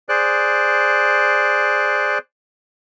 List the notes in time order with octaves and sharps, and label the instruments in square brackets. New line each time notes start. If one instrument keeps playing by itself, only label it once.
[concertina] G#4 C5 D5 F#6